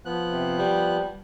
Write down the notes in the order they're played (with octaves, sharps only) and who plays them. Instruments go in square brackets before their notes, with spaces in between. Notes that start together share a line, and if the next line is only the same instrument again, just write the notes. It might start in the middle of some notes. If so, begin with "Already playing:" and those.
[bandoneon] F3 B3 F#6
[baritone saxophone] C3
G3